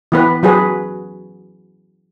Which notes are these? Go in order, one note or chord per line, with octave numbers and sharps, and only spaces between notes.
E3 B3 B4
F#3 F#4 G#4 B4